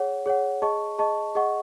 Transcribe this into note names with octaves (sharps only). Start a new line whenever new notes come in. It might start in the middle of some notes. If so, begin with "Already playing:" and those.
Already playing: G#4 C#5 F#5
G#4 C#5 F#5
G#4 D#5 A5 C#6
G#4 D#5 A5 C#6
G#4 D#5 F#5 C#6